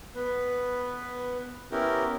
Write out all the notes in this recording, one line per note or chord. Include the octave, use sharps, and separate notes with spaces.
B3 B4
B3 C#4 E4 G4 A#4